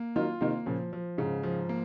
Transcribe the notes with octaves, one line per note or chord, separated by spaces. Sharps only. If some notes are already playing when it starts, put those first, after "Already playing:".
Already playing: A#3
D#3 F#3 F4
C3 D#3 A#3
A#2 C#3 F3
F3
G#2 C#3
F3
A#3